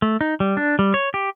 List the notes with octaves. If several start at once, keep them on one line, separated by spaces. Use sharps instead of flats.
A3
D#4
G3
D4
G3
C#5
G4